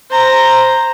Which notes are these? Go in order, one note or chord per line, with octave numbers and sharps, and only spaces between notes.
C5 A#5